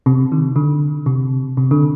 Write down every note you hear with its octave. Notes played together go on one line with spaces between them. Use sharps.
C3
D#3
D3
C3
C3
D3